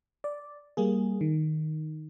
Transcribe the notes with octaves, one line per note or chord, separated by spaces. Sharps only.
D5
G3 A#3 G#4
D#3